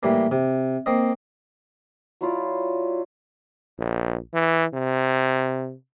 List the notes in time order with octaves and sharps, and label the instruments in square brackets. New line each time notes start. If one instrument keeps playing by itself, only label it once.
[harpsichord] A2 E3 G3 A#3
C3
A#3 C4 D#5
[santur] F#3 E4 F4 D5
[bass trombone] A#1
E3
C3